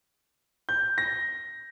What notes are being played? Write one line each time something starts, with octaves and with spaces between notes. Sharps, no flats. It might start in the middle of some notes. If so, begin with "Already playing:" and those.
G6
A#6